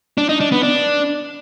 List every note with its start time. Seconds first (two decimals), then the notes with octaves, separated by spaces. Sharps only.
0.18 D4
0.29 D#4
0.40 D4
0.52 B3
0.63 D4